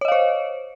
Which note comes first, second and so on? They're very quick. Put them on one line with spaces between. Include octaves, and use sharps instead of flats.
C#5 D#5 F5 C5